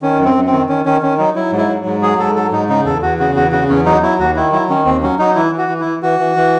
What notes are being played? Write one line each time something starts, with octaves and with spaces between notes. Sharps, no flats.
D#3 C#4
F#2
C4
F#2
C4
D#3
D#3 C#4
D#3 C#4
D#3 C#4
F#3 D#4
F#3 E4
G#2
E4
F#3
G#2
F#3 G#4
G#2 A4
F#3 A4
G#2 D#4
C#3 D#4
E2 A4
E2 F#4
C#3 F#4
E2 F#4
C#3 F#4
E2 C#4
F#3 D#4
F#3 E4
D#2 F#4
D#3 E4
F#3 E4
D#3 C#4
D#2 C4
F#3 C#4
F#3 D#4
E3 E4
E3
F#4
E3
E3 E4
E3 F#4
E3
E3